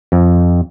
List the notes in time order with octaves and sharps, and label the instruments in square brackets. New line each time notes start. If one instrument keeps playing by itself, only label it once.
[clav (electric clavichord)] F2